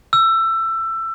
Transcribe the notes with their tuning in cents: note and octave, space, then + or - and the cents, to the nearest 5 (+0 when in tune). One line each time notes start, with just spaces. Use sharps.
E6 +20